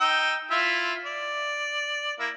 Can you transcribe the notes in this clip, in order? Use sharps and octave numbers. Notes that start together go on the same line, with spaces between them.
D#4 G5 E6
E4 F4 E5
D5
A#3 E4